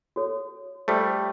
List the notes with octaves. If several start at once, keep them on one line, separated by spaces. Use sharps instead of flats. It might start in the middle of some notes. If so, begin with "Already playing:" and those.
F#4 A4 C#5
G3 A3 F4 A4 C5